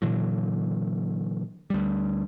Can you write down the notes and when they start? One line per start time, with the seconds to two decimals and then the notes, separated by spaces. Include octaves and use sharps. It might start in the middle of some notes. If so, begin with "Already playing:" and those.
0.02 A#2 D3 E3 F#3
1.70 D2 G3